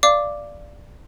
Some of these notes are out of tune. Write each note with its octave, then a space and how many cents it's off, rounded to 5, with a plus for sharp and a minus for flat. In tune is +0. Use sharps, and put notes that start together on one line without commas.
D5 +0 F5 -15 D6 +0